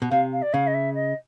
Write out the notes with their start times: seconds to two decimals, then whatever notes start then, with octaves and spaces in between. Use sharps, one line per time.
0.02 B2
0.11 C3 F5
0.33 F5
0.42 D5
0.53 C#3 F5
0.67 D#5
0.74 E5
0.95 D#5